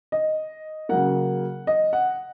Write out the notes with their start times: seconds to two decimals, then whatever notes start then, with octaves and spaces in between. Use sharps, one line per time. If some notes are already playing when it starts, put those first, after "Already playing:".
0.12 D#5
0.89 C#3 F#3 A#3 F#5
1.67 D#5
1.93 F#5